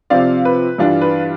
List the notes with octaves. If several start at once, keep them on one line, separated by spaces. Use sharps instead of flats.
C3 F3 C4 D5 F5
B4
G2 E3 G3 D4 F4
B4